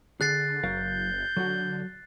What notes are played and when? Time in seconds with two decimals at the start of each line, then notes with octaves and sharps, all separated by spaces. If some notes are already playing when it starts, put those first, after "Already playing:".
0.21 D3 G#4 F#6 A6 C7
0.64 F#1 F#3 A#4 F5 G6
1.37 D3 F#3 F#4